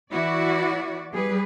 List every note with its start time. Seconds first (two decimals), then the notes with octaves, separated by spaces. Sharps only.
0.11 E3 E4 F#4 D5
1.12 G3 G#4 B4